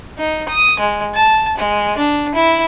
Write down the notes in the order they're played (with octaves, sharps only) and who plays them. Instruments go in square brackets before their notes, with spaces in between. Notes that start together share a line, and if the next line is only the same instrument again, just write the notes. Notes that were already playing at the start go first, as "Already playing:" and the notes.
[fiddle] D#4
D#6
G#3
A5
G#3
D4
E4